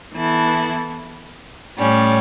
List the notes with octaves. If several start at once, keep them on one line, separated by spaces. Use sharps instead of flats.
E3 B3 E4 A4
A2 G3 C#4